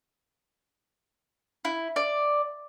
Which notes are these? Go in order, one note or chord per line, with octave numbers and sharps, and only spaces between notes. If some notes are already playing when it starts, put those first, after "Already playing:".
E4
D5